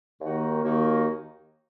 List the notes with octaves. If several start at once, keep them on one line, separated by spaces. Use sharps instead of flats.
D#2 D#3 A#3 D#4 F#4
D#2 D#3 A#3 D#4 F#4